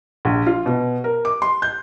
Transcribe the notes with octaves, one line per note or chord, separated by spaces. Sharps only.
A#1
F4
B2
A#4
D6
C6
G6